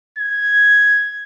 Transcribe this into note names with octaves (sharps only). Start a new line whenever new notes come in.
G#6